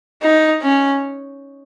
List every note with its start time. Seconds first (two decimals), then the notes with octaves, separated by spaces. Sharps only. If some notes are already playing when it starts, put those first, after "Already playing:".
0.22 D#4
0.62 C#4